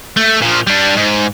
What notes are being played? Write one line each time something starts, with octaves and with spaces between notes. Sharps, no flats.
A3
A#2 F3
G3 D4
G#2